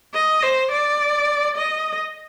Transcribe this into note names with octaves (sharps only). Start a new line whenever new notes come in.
D#5
C5
D5
D#5